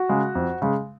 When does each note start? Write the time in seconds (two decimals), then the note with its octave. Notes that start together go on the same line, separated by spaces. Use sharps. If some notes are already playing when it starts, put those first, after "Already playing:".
Already playing: F#4
0.09 C#3 G#3
0.35 F2
0.62 C#3 G#3